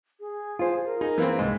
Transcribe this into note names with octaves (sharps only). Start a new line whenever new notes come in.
G#4
F4 C5
A#4
D#4 G#4
E3 A#3 C4
C2 G#2 D#5